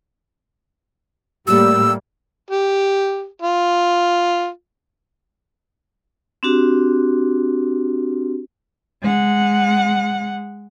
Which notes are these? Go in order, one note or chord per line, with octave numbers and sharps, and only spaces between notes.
A2 G3 A#3 E6
G4
F4
C4 D4 F#4 G4
G#3 F#5